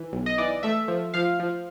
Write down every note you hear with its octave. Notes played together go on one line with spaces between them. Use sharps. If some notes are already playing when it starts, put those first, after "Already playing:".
Already playing: E3
B1
D#5
E3 D5
A3 E5
F3
F3 F5
F3